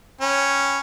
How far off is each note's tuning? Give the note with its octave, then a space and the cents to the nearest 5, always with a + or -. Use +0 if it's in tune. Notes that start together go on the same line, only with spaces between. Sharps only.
C#4 +0 G5 +0 B5 +0